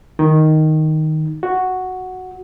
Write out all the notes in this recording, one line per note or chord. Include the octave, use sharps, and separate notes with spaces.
D#3
F#4